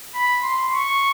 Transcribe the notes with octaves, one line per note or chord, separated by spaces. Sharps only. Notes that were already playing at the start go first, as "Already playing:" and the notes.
B5
C6
C#6